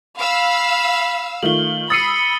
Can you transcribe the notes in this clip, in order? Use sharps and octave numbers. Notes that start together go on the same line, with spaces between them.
F5 B5 E6
D#3 A3 F4 F#7 G7
B5 D#6 E6 A6 C7 C#7 D#7